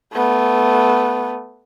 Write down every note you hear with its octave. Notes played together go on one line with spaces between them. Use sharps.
A3 B3